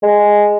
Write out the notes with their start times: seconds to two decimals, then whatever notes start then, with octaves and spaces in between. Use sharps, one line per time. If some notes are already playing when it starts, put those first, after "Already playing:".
0.03 G#3